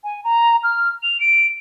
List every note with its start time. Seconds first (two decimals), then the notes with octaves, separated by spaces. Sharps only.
0.04 G#5
0.24 A#5
0.63 F6
1.03 F7
1.20 D7